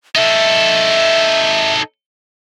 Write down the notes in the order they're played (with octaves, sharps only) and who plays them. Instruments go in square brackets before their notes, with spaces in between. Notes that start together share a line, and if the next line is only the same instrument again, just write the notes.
[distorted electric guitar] D#4 A4 [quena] E5